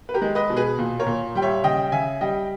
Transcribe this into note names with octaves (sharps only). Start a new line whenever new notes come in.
B4
G4 A#4
G#3
B4 D#5
B2
G#4 B4
A#2
A#4 C#5
A#2
G3 G5
C#5 E5
C#3 D#5 G5
C#3 E5 G#5
G3 D#5 G5